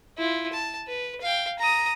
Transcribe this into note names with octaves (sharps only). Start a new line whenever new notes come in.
E4 F4
A5
B4
F5 G5
A#5 D#6